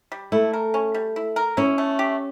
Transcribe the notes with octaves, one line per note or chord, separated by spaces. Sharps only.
G3
A3 E4
A#4
C#4
G3
E4
A#4
C#4 E4
A3
G4